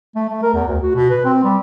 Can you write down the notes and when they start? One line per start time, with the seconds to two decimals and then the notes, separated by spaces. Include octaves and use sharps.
0.16 A3
0.29 A3
0.43 A#4
0.54 E2
0.68 D2
0.83 F#4
0.95 B2
1.10 B4
1.25 C4
1.44 G3